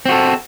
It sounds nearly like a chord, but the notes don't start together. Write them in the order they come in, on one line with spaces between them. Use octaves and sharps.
C4 F#4 A4